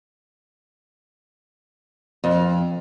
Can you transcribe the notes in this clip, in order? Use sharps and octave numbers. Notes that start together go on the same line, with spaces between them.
F2